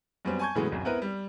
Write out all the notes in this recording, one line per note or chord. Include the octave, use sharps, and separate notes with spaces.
F#2 G3 B3 C4
G#5 A5 C#6 G6 G#6
A2 C#3 E3 F#3 G#3 B3
G#1 C#2 F#2
B3 C4 E4 A#4 B4
G3